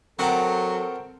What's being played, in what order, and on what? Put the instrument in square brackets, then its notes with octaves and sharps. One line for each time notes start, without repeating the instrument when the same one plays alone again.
[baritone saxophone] F#3 [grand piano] C4 A#4 G5 [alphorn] A4 [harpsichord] F#5 A5 A#5